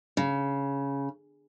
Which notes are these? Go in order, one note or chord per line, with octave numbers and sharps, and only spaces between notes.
C#3